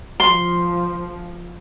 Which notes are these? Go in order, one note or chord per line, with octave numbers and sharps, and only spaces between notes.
F3 C6